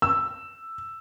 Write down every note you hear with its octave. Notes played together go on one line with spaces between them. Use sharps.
E6